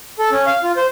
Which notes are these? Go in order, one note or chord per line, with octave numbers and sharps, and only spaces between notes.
A4
C#4
F5
F4
C5